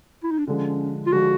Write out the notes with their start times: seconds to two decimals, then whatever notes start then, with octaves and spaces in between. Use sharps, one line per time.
0.23 E4
0.31 D#4
0.39 D4
0.47 D3 F3 G#3 C#4
1.07 F4
1.12 D3 F3 G#3 F#4